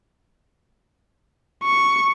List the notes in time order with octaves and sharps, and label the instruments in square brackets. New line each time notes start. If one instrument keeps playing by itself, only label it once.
[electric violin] C#6